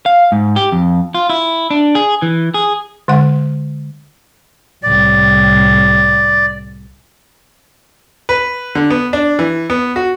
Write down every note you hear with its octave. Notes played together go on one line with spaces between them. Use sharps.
F5
G#2
G4
F2
F4
E4
D4
G#4
E3
G#4
D3 G#3 F#5
C2 A2 D5
B4
D3
B3
D4
E3
B3
F#4